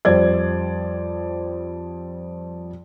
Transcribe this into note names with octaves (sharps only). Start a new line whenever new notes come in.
F2 G3 C5 D5 G#6